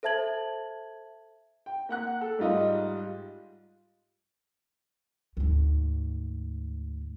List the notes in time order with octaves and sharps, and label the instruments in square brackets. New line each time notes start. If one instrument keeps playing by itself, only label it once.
[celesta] A4 C5 E5 A5 G#6 F#7
[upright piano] G5
A#3 F#5 F#6
A4
G#2 G3 F4 D#5
[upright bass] D2 G#2